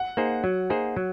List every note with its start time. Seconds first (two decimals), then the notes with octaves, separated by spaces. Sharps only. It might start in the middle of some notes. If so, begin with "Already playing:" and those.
Already playing: F#5
0.17 A#3 D#4 G#4 C5
0.44 F#3
0.70 A#3 D#4 G#4 C5
0.96 F#3